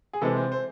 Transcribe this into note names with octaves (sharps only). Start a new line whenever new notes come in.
G#4
C3 E3 G#3 C4 A4
C5
C5